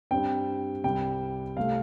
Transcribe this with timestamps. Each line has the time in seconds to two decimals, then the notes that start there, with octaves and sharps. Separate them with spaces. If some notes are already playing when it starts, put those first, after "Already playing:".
0.11 G2 G3 C4 G5
0.84 C2 C3 G3 C4 G5
1.57 C2 C3 A3 F5